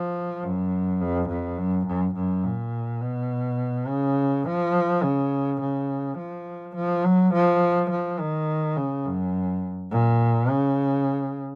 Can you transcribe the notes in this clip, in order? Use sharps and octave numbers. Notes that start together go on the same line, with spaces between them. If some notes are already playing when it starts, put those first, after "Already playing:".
Already playing: F3
F#2
F2
F2
F#2
F#2
F#2
A#2
B2
C#3
F3
C#3
C#3
F3
F3
F#3
F3
F3
D#3
C#3
F#2
A#2
C#3